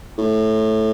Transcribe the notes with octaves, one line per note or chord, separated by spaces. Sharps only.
A2